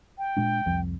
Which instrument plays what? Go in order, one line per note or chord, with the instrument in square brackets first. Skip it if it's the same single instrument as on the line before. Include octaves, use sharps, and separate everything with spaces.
[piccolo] G5
[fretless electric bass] A#2 G#3 D4
C2 F2 F3